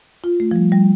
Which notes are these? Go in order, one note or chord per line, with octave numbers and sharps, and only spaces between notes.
F4
A3
F3
G3
G3